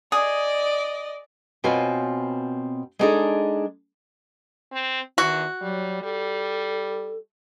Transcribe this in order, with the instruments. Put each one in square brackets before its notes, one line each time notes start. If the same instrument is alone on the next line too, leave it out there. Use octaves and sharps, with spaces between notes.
[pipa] G#4 [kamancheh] D5 D#5
[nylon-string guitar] B2 C4 F4 F#4 C#5 G#5
G#3 B3 D4 D#4 G#4 A4
[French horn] C4
[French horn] E2 [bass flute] D#3 [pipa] F#4
[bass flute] F#3 [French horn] G3
[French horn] G3 [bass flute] A4